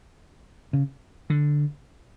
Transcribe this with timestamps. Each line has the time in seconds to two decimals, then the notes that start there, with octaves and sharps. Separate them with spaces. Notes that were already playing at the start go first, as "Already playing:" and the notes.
0.73 C#3
1.30 D3